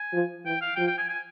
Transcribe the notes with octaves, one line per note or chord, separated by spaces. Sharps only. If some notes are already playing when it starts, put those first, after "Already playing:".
Already playing: G#5
F3
E3 G5
F5
F3 G5
G5
G#5
G#5